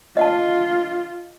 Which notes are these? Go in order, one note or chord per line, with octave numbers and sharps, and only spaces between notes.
F4 D#5 F#5 A5